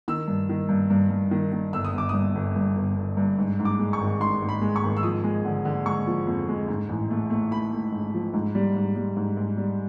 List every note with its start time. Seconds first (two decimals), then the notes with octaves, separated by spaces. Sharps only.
0.08 D#3 E6
0.28 G2
0.49 D#3
0.69 G2
0.90 G2
1.10 G2
1.31 D#3
1.52 D#3
1.73 G1 E6
1.85 D#6
1.94 G1 D6
2.09 G2 D#6
2.35 G1
2.56 G2
2.76 G1
2.96 G1
3.17 G2
3.38 G#2
3.59 G#2
3.65 D6
3.79 G#3
3.93 C#6
4.01 G#1
4.20 G#2 C6
4.42 G#2
4.49 B5
4.61 G#3
4.76 C#6
4.83 G#1
4.97 E6
5.03 F3 D#6
5.24 G#3
5.45 D3
5.65 D3
5.86 G#3 C#6
6.07 F3
6.27 F2
6.48 G#3
6.68 G#2
6.89 A1
7.10 A3
7.30 A3
7.51 A3 B5
7.72 A3
7.92 G#2
8.14 F3
8.33 G#2
8.55 G3
8.76 G#2
8.96 G3
9.17 G#2
9.37 G#2
9.57 G3